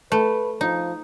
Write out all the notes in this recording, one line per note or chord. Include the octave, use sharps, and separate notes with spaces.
A3 B4
F3 D#4